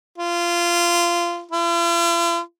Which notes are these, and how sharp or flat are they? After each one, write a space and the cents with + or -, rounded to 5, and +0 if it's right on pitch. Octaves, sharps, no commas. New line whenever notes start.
F4 -20
F4 -45